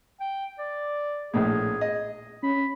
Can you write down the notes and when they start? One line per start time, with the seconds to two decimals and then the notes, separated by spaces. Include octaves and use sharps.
0.21 G5
0.58 D5
1.34 A#1 A2 G#4
1.81 D#5
2.43 C#4 B5